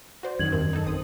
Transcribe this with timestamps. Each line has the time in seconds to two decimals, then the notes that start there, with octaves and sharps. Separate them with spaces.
0.23 F#4 C5 D5
0.39 F#2 D#3 F#3 G#6 F#7
0.52 E2 G2 C4 A#4
0.73 D#4 A4
0.86 A1 C4 D#6